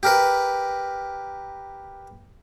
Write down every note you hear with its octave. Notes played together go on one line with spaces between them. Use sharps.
G4 A#4 B4